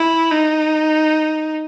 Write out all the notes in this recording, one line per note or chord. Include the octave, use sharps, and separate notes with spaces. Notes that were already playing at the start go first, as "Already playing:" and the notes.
Already playing: E4
D#4